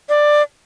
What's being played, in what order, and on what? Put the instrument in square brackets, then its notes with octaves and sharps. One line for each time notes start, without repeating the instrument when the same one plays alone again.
[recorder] D5